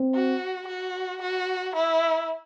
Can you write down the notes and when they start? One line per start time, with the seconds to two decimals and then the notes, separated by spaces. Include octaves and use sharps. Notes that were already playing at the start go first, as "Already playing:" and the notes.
Already playing: C4
0.15 F#4
0.68 F#4
1.22 F#4
1.75 E4